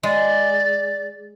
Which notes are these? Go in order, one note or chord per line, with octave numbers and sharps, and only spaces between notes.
G#3 D5